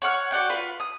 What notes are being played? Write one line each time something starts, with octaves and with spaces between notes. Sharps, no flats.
C#5 F#5 C#6 F6
F#4 D5 F#5 G5
F4 B4
D#6